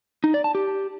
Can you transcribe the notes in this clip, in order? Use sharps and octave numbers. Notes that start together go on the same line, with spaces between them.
D#4
D5
A5
G4